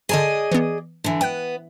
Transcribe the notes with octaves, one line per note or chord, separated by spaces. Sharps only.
D3 G#4 D5 D#5 A5 A6
E3 B3
D3 E3
B3 G5 F#6